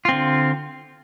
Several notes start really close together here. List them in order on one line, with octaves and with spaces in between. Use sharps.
F4 C4 D3